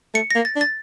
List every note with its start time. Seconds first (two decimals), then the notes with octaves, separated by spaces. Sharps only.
0.14 A3 C#7
0.30 A#3 A#6
0.45 A6
0.56 D4
0.61 A6